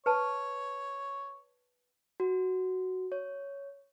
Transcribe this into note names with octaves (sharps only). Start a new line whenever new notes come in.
B4 C#5 A5
F#4
C#5